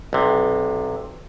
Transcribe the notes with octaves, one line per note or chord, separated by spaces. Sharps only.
B1 C3